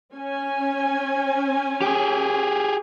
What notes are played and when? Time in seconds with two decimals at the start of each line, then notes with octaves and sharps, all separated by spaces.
0.13 C#4 C#5 G#5
1.82 G4 G#4